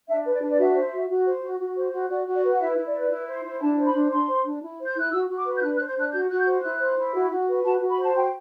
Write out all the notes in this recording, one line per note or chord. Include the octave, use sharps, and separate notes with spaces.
D4 E5
B4
D5
D4
D5
F#4 E5
C5
F#4
F#4
C5
F#4
F#4
C5
F#4
F#4 D5
F#4
D5
B4
F#5
E4 E5
E4
D5
B4
E4
C5
E4
D4 A5
C5
B5
D4
D4 C6
C5
D4
E4
C5
G6
E4 F#6
F#4 E6
F#4
D6
B4
G6
D4 F#6
F#6
C5
G6
D4 F#6
F#4 G6
F#4 F#6
G6
C5
E4 F#6
C5
E4
F#4
F#4
B4
F#4 A5
F#4
B5
C5
A5
F#4 G5